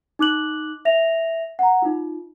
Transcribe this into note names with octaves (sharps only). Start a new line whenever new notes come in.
D#4 D6 F#6 F#7
E5 A#6 F7
F#5 A#5
D#4 F4